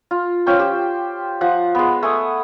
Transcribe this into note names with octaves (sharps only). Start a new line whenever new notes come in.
F4
F3 C#4 G5 C#6
G4 C5
F3 F#5
G#3 B3
A3 G#5 D#6